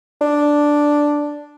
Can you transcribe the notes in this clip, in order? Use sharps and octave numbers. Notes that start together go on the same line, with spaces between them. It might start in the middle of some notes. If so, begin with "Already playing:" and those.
D4